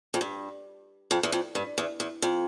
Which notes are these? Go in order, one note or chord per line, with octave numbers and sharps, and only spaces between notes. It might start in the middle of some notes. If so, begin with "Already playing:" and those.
F2
G2
F2
E2
F2
G2
E2
E2
F2